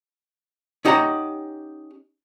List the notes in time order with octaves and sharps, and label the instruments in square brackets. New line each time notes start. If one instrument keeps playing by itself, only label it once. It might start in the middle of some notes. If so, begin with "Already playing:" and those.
[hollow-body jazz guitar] C#4 D#4 G4 F#5 A5 A#5